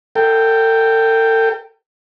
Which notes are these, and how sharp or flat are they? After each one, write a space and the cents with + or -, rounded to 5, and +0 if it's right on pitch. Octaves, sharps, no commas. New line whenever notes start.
A4 +40 G5 +0